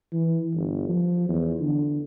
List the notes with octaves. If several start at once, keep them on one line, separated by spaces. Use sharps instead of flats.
E3
G1
F3
E2
D3